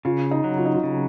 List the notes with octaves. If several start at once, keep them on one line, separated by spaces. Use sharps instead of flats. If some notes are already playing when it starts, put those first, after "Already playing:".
C#3 F4
D#4
F#3
F4
D#4
F4
C#3